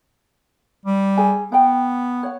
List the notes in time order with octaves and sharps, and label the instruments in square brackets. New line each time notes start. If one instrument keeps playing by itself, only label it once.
[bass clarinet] G3
[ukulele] G#4 G#5
[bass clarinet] B3 [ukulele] F#5 G5
[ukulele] C#5 F#5